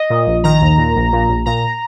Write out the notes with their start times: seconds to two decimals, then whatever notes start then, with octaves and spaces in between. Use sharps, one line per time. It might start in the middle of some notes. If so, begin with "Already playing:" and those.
Already playing: D#5
0.10 A#2
0.27 A#1
0.44 D#3 A#5
0.61 D#2
0.78 A#2
0.95 A#1
1.13 A#2
1.29 A#1
1.46 A#2 A#5